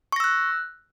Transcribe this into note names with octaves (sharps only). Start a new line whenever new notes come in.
C#6 E6 F#6 A#6